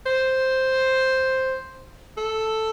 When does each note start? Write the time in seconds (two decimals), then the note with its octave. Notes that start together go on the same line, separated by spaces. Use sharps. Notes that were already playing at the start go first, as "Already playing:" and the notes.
0.06 C5
2.18 A4